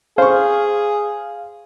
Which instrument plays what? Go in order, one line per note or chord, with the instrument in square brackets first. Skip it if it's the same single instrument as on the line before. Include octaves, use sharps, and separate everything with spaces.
[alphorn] G#4 [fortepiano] C5 C#6 [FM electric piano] F5